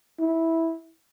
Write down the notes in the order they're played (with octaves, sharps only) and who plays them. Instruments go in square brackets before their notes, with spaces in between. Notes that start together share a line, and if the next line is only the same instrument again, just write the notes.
[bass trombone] E4